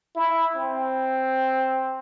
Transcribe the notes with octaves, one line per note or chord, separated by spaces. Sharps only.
E4
C4